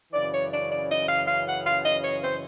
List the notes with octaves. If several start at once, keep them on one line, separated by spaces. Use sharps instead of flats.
F#2 C#3 E3 D5
C#5
D5
D5
D#5
F5
F5
F#5
F5
D#5
C#5
C5